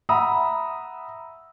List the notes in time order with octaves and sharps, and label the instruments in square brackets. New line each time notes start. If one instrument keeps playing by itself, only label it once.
[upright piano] E5 F#5 A#5 B5 D#6 E6